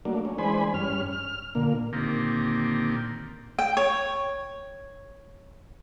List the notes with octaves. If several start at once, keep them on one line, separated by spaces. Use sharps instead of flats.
F#3 A3 A#3 D4
C#4
E3 G#3 D4 C5 G#5 B5
G2 C#4 F6
F6
A#2 D3 A#3
A#2 D3 D#3 A#3 C4 G4
G5
C#5